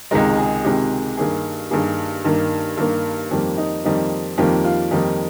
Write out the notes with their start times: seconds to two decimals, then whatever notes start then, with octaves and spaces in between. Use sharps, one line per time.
0.11 C#2 C3 D#3 G#3 A#4
0.38 G#4
0.65 C#2 C3 D#3 G#3 G4
1.17 G2 D#3 A#3 G#4
1.71 G2 D#3 A#3 G#4
2.25 G2 D#3 A#3
2.77 G2 D#3 A#3
3.31 F2 D#3 G3 A#3
3.58 D#4
3.84 F2 D#3 G3 A#3 D#4
4.38 F2 D#3 G3 A#3 F4
4.64 F4
4.91 F2 D#3 G3 A#3 D#4